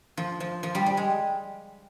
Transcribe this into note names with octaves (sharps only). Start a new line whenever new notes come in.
F3
F3
F3
G3
G3
G#3